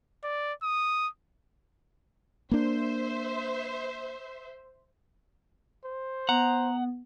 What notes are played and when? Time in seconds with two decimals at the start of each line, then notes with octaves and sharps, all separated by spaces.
0.24 D5
0.63 D#6
2.51 A#3 D4 C5 E5
5.85 C5
6.29 B3 F#5 A#5